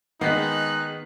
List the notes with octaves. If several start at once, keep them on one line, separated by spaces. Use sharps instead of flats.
D#3 G#3 B3 D#4 F#6 B6 C7